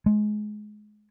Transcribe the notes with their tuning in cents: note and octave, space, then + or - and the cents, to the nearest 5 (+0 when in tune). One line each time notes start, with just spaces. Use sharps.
G#3 +25